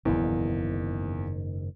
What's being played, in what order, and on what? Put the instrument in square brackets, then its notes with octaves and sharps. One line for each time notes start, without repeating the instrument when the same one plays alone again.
[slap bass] F#1 G#2 D#3 [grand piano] E2